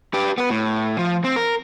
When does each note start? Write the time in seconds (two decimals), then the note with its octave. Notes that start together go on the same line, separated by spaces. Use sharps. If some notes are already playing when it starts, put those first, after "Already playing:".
0.14 G4 B4
0.38 B3 B4
0.50 A2
0.99 F3
1.24 C4
1.36 A#4